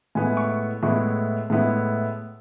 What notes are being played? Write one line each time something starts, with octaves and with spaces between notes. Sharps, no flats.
A2 G#3 B3 E4 G#5
C#6
A2 G#3 B3 E4 C#6
A2 G#3 B3 E4